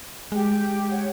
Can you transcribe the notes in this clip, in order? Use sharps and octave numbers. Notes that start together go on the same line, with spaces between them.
G#3 G4
C#5 F#5